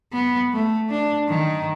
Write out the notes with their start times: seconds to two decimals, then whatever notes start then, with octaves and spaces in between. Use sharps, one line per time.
0.13 B3
0.53 A3
0.90 D4
1.29 D#3